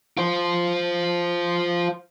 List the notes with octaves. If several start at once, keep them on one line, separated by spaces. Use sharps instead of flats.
F4 C5